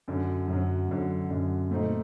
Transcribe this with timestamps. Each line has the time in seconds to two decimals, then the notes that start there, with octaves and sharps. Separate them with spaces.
0.08 F#2 D3 F#3
0.48 F#2 D3 F#3
0.89 F#2 D3 F#3
1.30 F#2 D3 F#3
1.71 A#2 A3 C4 D#4 A4